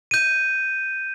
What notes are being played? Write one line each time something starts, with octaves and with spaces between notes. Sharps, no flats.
G6 D#7